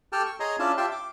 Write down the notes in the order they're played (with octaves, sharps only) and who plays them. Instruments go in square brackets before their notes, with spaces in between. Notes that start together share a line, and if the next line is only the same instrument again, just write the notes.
[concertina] G4 A4 G5 A5 F6
C#6
G#4 C#5 D#5 G#5 A#5 C6
C#4 D4 E4 F4 A5
F4 G4 E5 G5 A5 C6
D6